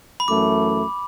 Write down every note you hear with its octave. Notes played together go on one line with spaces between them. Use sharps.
B5
F#2 E3 A3 D6